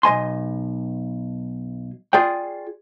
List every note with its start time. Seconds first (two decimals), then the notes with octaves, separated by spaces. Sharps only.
0.03 B1 D#5 G#5 C6
2.13 F4 G#4 D5 G5